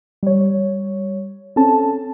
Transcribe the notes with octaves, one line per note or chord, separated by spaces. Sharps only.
G3 C#5
C4 C#4 A4 A5